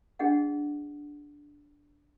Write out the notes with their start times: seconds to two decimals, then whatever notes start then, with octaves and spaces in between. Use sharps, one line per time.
0.19 D4 G#4 D#5 F#5